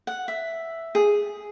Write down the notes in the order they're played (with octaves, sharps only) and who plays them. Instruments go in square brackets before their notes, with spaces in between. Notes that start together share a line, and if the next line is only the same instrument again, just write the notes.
[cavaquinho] F#5
E5
G#4